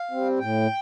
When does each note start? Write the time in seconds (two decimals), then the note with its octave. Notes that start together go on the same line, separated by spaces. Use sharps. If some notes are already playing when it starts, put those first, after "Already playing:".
Already playing: F5
0.11 G3 C4
0.39 A2 G5